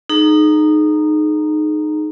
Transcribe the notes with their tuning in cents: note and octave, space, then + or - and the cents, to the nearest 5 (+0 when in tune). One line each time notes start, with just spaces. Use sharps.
D#4 -20 G#4 +35 A#5 +0